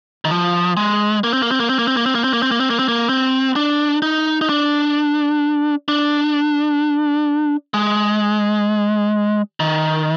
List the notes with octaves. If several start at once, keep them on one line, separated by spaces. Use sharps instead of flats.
D#3
F3
G#3
A#3
C4
A#3
C4
A#3
C4
A#3
C4
A#3
C4
A#3
C4
A#3
C4
A#3
C4
A#3
C4
A#3
C4
D4
D#4
D#4
D4
D4
G#3
D#3